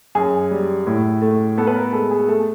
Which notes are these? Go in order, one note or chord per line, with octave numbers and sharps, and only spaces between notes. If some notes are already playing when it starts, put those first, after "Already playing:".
F#2 G#4
G3
A2
A3
B3 A4
B4
A#4
G#3 A4
G#4
A3 A4